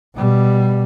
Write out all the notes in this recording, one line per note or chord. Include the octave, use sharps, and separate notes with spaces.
B2 G3